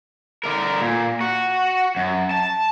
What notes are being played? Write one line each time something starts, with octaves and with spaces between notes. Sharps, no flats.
D3 A#4
A#2
F#4
F#2
A5